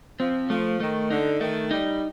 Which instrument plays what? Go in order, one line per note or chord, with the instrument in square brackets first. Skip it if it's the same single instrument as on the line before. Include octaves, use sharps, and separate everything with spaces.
[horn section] F3 [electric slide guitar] C4
[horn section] F3 [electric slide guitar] A3
[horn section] D#3 [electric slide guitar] A3
[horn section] D3 [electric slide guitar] D#4
[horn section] D#3 [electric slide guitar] A3
[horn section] G3 [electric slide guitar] D#4